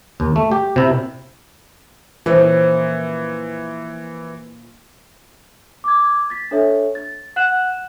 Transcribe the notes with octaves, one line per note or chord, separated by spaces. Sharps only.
D#2
A3
G4
C3 E4
A#2 E3 F3 C#4
D6 G#6
A6 B6
D4 A4 C#5 E5
A6
F#5 F#6 E7 F#7